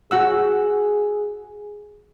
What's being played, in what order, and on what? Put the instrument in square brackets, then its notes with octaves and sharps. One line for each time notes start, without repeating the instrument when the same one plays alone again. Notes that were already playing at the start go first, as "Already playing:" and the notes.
[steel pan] F#4 F#5 E6 [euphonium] G#4